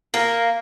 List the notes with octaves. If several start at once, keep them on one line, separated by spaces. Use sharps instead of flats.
A#3